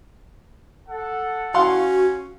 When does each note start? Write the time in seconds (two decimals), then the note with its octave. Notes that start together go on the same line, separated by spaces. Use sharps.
0.87 A4 F#5
1.54 C#4 F#4 F5 F#5 C6